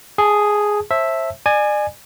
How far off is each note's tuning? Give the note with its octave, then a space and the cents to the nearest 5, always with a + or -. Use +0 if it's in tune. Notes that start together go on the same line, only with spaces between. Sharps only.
G#4 +0 A5 -25
C5 +35 E5 +0 A5 +0
D5 +40 G#5 +0